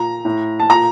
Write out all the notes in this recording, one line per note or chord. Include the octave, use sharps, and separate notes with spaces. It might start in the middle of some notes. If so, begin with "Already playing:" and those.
Already playing: A#2 A#5
A2
A5
A#2 A#5